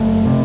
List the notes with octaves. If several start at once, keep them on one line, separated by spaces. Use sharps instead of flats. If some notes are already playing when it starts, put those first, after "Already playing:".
Already playing: F#1 A3
C3